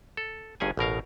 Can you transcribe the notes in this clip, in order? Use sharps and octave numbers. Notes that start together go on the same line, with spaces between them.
A4
G1 G2 C#4 G#4 G#5
A1 B2 A#4 F5